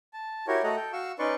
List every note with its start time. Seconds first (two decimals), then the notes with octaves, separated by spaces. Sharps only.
0.13 A5
0.47 E4 F#4 G4 A#4 C#5
0.64 A3 F#4 A4 D#5 F#5 A#5
0.76 A4 G5
0.93 F#4 F5 C#6 E6
1.19 C#4 D#4 B4 D5 C6 C#6